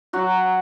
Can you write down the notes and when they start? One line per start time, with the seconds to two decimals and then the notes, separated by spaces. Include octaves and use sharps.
0.13 F#3 F#4